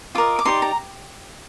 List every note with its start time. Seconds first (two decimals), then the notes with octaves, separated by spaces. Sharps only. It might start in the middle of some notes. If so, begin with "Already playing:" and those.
0.15 F4 A#4 D#5 D6
0.39 D6
0.45 D#4 G4 D5 C6
0.62 A#5